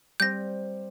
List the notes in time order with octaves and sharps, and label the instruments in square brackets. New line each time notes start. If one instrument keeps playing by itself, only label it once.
[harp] G3 C4 [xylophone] G6 A#6